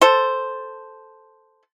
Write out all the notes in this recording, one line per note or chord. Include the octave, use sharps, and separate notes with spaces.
A4 C5